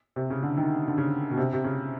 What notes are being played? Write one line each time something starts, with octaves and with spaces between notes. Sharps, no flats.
C3
C#3
D3
D#3
D3
C#3
B2
C3
C3
C#3